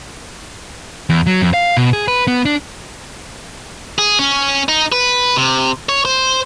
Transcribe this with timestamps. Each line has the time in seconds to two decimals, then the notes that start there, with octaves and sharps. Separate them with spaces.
1.10 E2
1.27 F#3
1.41 F2
1.54 F5
1.77 B2
1.93 G#4
2.08 B4
2.27 B3
2.45 D4
3.99 G#4
4.19 C#4
4.69 D#4
4.92 B4
5.36 C3
5.89 C#5
6.05 C5